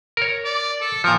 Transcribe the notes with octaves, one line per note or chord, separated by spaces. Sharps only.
A#4 C#5
D5
A4
A#2 F3 A#4